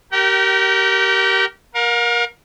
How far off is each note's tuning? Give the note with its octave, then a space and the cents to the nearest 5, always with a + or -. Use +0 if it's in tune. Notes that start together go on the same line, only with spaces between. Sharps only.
G4 -25 A#4 +0 G5 -40
A#4 +20 F5 +45